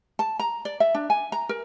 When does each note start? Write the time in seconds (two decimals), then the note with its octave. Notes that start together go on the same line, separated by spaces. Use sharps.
0.19 A5
0.39 A#5
0.65 D5
0.80 E5
0.94 D4
1.10 G#5
1.32 A#5
1.49 A#4